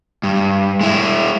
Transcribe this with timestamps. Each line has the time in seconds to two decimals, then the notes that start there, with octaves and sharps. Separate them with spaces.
0.23 G2
0.81 G#3 E4